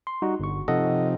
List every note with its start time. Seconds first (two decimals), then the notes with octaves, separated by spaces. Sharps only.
0.07 C6
0.22 G3 D#4 F#4
0.40 G1 C#6
0.68 C3 F3 D#4 A4 D#5 F#5